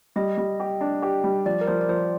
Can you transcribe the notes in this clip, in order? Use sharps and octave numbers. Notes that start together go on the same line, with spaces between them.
G3 D#5
G3
G4
D4
G4
G3
F3 D5
A#4
F3 C5
D5
F3 C5